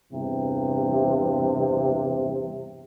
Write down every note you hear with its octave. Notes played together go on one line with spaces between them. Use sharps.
E2 G2 C3